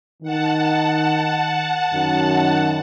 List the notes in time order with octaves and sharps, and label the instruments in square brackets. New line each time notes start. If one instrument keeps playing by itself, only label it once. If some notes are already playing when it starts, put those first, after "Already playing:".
[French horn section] D#3 [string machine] F#5 A5
[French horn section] F#2 D#3